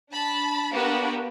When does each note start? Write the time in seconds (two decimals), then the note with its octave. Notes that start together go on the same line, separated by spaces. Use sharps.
0.11 D4 A5 B5
0.72 A#3 B3 D4 F#4 G4 B4